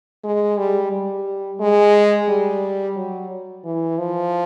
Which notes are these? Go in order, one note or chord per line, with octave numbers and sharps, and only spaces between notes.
G#3
G3
G3
G#3
G3
F#3
E3
F3